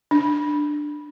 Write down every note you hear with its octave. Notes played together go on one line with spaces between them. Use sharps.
D4